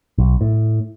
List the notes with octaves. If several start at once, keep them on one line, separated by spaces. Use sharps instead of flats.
B1
A2